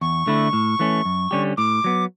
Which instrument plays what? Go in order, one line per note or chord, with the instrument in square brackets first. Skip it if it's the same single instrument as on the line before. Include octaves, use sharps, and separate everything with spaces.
[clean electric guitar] E2 [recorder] C#6
[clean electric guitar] D3 A3 E4
A2
E3 A3 C#4
F#2
D3 G3 C#4 G4
[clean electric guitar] A2 [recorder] D6
[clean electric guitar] F#3 B3